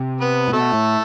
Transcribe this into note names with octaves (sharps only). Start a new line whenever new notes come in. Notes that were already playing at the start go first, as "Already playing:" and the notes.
Already playing: C3
B3 B4
A2
B2 A3 A4
A2